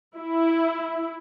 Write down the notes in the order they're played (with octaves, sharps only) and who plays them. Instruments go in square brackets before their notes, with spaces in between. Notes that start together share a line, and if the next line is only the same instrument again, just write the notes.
[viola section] E4